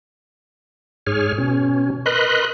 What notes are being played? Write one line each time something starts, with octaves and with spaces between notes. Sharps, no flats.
G#2 G#4 C#5 F6
B2 C#4
A#4 B4 D#5 B5 C6 F#6